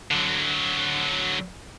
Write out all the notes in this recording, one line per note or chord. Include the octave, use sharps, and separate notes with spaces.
D3 F#3